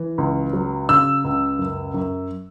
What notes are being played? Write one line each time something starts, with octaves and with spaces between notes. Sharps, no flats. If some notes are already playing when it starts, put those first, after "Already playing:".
Already playing: E3
C#2
F#3
C#3 E6
C#2
F#2
F#2